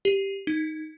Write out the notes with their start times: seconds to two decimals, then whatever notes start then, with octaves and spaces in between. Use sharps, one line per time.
0.05 G4
0.47 D#4